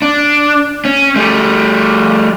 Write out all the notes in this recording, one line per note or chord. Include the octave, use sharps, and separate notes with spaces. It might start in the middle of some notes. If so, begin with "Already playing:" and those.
D4
C#4
G3 A3